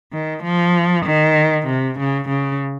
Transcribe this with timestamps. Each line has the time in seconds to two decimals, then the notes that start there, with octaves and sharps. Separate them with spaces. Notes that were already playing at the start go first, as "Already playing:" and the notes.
0.13 D#3
0.44 F3
1.06 D#3
1.67 C3
1.99 C#3
2.29 C#3